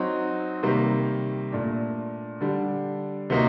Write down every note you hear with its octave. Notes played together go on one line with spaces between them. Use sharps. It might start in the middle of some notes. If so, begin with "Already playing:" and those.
Already playing: F#3 C4 D#4
C3 D#3 G3 A#3
A#2 A3 D4
D3 G3 D4
C3 F#3 A#3 D#4